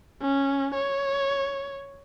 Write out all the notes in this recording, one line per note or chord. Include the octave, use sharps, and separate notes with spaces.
C#4
C#5